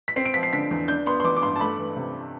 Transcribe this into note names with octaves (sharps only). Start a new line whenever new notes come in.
B6
C4 C7
D7
F3 B6
C7
D3 B6
E2
D4 G6
B3 C6
C6
E3 D6
D6
G2 C6
A5
A3 B5
E3
C3